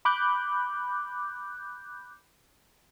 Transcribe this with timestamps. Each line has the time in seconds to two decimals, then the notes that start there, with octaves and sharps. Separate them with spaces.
0.05 B5 D6 F#6 G6